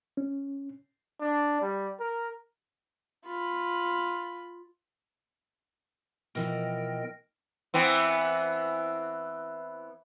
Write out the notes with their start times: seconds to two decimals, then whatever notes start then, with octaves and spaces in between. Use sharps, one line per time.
0.17 C#4
1.20 D4
1.61 G3
1.99 A#4
3.25 F4 B5
6.35 B2 E3 F3 A#4 D#5 G5
7.74 E3 B3 C4